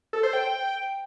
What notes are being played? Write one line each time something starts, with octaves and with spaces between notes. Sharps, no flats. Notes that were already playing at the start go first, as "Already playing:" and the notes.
A4
C5
G5